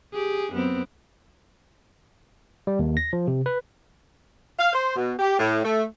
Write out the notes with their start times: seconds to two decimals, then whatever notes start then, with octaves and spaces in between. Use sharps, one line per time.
0.13 G4 G#4
0.53 F#2 B3 C4
2.67 G3
2.79 D#2
2.97 A#6
3.13 F3
3.28 C3
3.46 B4
4.59 F5
4.73 C5
4.96 B2
5.19 G4
5.39 A2
5.64 A3